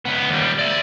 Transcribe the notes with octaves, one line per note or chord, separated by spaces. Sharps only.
C#2 B3
D#2 G3
D5 E5